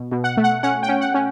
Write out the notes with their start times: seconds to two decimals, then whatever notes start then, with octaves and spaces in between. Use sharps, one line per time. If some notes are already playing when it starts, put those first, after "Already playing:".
Already playing: B2
0.12 B2
0.24 F#5
0.37 A3
0.44 F#5
0.63 C#4 F#5
0.83 G5
0.89 C#4
1.01 F#5
1.14 C#4